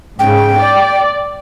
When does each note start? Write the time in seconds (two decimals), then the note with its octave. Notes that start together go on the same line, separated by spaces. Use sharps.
0.19 G#2 C#3 G5
0.58 D5